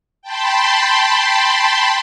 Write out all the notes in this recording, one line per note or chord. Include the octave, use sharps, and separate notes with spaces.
G5 A5 B5 C6